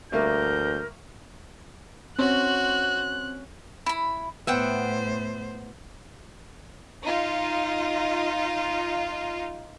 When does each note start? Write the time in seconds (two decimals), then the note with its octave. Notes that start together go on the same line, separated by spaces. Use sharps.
0.12 D2 G3 A3 A#3 A#4 G6
2.19 C4 C#4 F#4 F#6
3.86 E4 B5
4.47 A2 B3 C5 E5 F#5 G5
7.03 D#4 F4